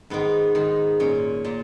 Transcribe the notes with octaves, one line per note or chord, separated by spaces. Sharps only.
G#2 D#3 B3
G#2 D#3
A#2 C#4
A#2